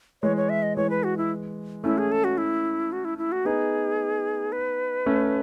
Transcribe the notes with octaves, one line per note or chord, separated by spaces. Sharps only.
E3 G#3 C#5
C#5
E5
D#5
E3 G#3 C#5
B4
F#4
E4
A3 C#4 E4
G#4
A4
F#4
E4
F#4
E4
E4
F#4
B3 D#4 G#4
B4
A3 C#4